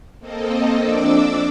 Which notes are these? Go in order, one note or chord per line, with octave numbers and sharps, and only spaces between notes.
A#3 C4 A4 D#5
F2 D4 D6 E6